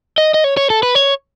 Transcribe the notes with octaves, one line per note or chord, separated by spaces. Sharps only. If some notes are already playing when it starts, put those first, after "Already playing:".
D#5
D#5
C#5
C#5
A4
B4
C#5